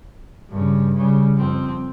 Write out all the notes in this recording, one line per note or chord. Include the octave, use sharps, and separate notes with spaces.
G2 C#3
C#3 G3
F2 C4